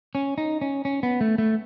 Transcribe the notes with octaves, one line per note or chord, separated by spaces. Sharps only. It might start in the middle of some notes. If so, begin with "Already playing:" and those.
C#4
D#4
C#4
C#4
B3
A3
A3